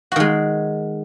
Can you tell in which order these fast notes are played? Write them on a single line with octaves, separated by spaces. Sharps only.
F#4 D#3 G#3